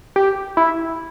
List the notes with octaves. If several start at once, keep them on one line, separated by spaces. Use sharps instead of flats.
G4
E4